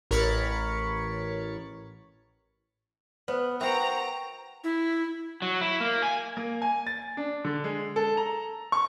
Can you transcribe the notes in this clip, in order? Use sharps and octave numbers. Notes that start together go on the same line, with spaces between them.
A1 A#4 C#5 B5 A6 C#7
B3 B4 C5
F#4 A#4 C5 E5 F#5 G5 A#5
E4
F#3
E4
A#3
G#5
A#3
G#5
A6
D4
D3
G#3
A4
A#5
C#6